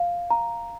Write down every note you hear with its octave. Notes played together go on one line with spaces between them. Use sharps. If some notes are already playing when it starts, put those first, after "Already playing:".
Already playing: F5
A#5